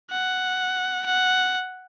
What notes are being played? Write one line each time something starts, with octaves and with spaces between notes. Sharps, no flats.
F#5
F#5